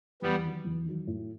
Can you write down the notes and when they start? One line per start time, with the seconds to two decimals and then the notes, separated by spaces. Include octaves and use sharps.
0.22 E2 G3 B3
0.43 D#3 F#3
0.65 E2
0.86 D#3 F#3
1.07 A2